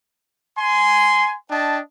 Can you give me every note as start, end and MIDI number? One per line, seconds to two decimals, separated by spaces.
0.58 1.34 80
0.58 1.34 84
1.49 1.80 62
1.49 1.80 75
1.49 1.80 79
1.49 1.80 81